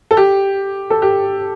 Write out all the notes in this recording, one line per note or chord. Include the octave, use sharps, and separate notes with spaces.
A4
G4
A4
G4